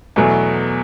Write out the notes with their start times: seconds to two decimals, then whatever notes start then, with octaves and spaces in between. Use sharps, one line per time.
0.16 E2 B2 F#3 A3